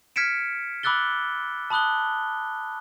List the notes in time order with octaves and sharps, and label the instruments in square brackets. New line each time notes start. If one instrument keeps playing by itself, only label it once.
[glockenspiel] F6 G#6 B6 C#7 D7 E7
B5 D6 E6 F#6 A6 G7
A5 B5 D#6 F#6 G7